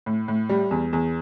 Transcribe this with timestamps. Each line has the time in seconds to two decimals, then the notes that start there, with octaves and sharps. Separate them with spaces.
0.06 A2
0.28 A2
0.49 G3
0.71 E2
0.93 E2